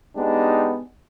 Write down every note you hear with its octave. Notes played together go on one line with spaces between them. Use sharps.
G#3 B3 D4 D#4 G4